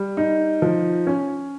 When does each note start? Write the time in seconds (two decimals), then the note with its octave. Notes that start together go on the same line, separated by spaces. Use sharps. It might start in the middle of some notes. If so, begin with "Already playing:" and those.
Already playing: G3
0.17 D#4
0.62 F3
1.07 C#4